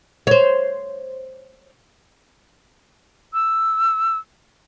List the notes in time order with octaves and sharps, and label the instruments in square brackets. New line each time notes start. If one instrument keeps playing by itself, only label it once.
[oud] C5 C#5
[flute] E6